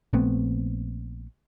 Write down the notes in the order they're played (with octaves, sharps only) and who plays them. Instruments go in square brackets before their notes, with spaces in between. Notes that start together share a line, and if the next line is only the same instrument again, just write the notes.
[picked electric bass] A#1 A3 B3 C4